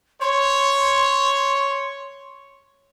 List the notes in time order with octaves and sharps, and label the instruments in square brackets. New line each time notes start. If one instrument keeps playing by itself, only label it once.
[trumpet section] C#5 [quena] C6